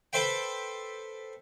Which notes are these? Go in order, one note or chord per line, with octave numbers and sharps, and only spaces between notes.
A4 B4 C5 E5 G5